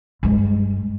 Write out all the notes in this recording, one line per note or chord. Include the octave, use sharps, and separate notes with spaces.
G2 G#3